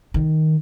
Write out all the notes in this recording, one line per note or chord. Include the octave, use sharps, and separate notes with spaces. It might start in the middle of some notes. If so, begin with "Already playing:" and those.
D#3